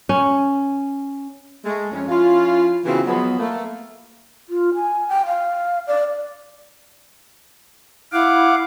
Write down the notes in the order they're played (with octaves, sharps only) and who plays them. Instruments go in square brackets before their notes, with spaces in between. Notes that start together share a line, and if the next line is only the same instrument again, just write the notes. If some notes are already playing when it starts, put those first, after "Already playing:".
[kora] C#4
[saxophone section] G#3 A3
F2 C#4
F3 C#4 E4 F4
C#3 E3 B3 C4 F4 F#4
F3 F#3 G#3 B3
A3 A#3
[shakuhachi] F4
G#5
G5
F5
D5
[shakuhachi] E4 [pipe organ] F5 F#5 D6